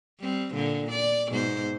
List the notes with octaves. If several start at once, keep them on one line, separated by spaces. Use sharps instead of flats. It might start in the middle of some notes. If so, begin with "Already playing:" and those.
G3 C4
A#2 D3
D5
G#2 B2 C5